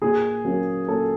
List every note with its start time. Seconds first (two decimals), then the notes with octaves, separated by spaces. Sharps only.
0.02 A#2 G#4
0.45 F#3 A#3 C#4
0.88 A#2 A4